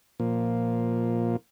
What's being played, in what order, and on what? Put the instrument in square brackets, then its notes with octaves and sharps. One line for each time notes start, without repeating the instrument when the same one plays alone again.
[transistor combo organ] A#2 F3 A#3